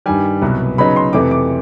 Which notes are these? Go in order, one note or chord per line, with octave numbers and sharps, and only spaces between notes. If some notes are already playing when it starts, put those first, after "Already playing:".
G2 D#3 G3 G#5
C2 B2 F#3 B3
C#3 F#3 B3 D#4 B5
C6
F2 C3 E3 A3 D6
D6